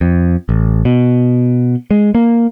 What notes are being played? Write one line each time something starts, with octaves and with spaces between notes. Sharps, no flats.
F2
A1
B2
G#3
A#3